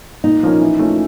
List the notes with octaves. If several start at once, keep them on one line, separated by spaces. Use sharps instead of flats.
A#2 D#4
F3 A#3 C#4
E3
A3 C#4 F4 A4